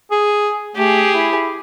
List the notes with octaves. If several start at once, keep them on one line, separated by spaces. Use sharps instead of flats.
G#4
A3 G4 G#4
E4